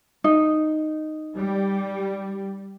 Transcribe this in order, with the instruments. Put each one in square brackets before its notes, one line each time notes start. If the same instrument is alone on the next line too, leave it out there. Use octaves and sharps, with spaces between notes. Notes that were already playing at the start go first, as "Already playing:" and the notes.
[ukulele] D#4
[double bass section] G3